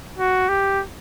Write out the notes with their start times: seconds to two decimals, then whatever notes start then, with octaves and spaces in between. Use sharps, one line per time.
0.18 F#4
0.49 G4